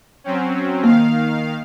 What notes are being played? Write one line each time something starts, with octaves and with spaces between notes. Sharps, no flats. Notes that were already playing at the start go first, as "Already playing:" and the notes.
F#3 C4 C#4
D#3 A#3 F5